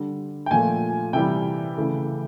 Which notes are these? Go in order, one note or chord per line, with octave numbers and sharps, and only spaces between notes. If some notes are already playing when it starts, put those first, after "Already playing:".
Already playing: D3 G3
G5
A#2 F3 A3 G#5
C3 E3 G3 G5
C#3 E3 A3